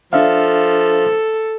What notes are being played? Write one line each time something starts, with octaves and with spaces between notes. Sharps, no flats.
F3 D4 A4 E5 F5